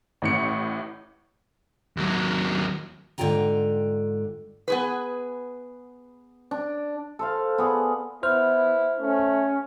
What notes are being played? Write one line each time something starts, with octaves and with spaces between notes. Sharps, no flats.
A1 A2 C#7
D#2 F#3
G#2 D3 A3 F4 G5 A#5
B3 G#4 B4
D4
A4 C5 F5
B3 G#4 D5
B3 E4 C5 F6
A3 C#4